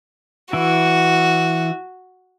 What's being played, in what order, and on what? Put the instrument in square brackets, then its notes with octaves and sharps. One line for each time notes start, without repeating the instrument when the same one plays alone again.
[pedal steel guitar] E3 E4 [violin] F#4